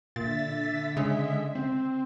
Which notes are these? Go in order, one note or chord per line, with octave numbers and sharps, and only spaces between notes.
A#2 D3 E5 A6 B6
C#3 G#3
C4